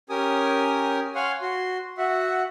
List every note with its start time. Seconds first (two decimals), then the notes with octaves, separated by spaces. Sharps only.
0.10 C#4 G4 A#4 G#5 D#6
1.15 C#5 F5 F#5 G#5 C6
1.41 F#4 C6
1.98 F#4 E5 F#5